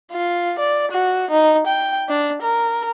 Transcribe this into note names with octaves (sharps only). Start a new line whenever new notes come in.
F4
D5
F#4
D#4
G5
D4
A#4